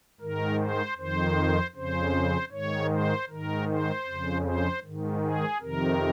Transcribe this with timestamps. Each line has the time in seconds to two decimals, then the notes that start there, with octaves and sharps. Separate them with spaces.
0.20 G#2 D#3 A#4
0.60 C5
0.98 F2 D#3 C5
1.76 F2 C#3 C5
2.52 G#2 D#3 C#5
2.90 C5
3.29 G#2 D#3 A#4
3.68 C5
4.07 F2 C#3
4.45 C5
4.83 G#2 D#3
5.23 G#4
5.61 F2 C3 D#3 A#4